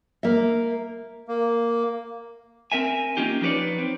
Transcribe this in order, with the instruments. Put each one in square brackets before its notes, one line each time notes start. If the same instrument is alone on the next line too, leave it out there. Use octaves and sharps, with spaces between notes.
[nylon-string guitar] A#3 E5
[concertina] A#3
[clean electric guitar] C4 A#4 E5 G#5
A#3 C#4 D#4 F4 G4
F3 D#4 G4 B4 C#5 D5
C4